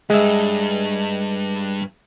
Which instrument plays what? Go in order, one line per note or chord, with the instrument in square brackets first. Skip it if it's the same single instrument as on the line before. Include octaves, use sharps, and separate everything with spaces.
[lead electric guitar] G2 [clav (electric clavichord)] G#3 E5